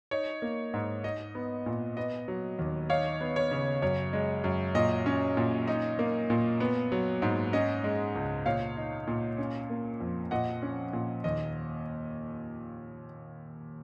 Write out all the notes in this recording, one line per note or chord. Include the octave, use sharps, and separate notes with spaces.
D#4 C#5
A#3
G#2
D#4 D#5
B3
A#2
B3 D#5
F#3
D#2
D#4 C#5 F5
B3
C#5
C#3
F#2 C#5
G#3
F#2
A#2 D#5
C#4
A#2
D#4
A#3
A#2
B3
F#3
G#2
C#4 D#5
G#3
C#2
A#2 C#5 F5
D#4
A#2
C#4
A#3
F2
A#2 D#5 F#5
C#4
A#2
D#2 D#5